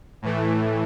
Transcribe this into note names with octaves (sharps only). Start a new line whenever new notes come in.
A2 E3 A3